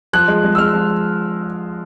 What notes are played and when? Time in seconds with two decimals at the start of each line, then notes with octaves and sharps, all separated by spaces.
0.13 F3 F#6
0.28 G#3
0.44 G#3
0.55 E6
0.58 G#3 F6
0.74 F3